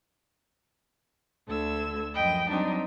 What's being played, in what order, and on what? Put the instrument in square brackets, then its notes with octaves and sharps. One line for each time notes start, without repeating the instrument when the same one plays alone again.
[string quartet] D2 A4 E6 G#6
F#2 F3 D#5 G5 B5
F#3 G3 C4 D4 D#4 G5